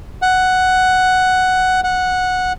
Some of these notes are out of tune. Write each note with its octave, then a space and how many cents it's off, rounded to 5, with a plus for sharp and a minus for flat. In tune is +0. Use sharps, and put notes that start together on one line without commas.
F#5 +5
F#5 -10